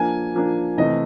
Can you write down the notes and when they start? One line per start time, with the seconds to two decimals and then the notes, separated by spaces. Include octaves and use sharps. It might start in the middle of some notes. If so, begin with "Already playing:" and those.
Already playing: F3 A#3 D4 G#5
0.35 F3 A#3 D4
0.77 C3 E3 A3 D#5